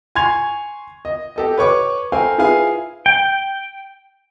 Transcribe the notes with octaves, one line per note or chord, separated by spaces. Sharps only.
G#5 C6 C#6 G#6 F7
D#5
G4 A4 D#5
B4 C#5 C#6 D6
A4 A#4 C5 F5 G5 G#5
E4 F4 G#4 B4 F5 G#5
G5